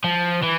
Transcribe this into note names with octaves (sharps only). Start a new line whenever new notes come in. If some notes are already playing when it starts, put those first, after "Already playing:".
F3
E3